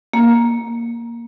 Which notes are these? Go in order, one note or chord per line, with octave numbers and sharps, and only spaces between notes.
A#3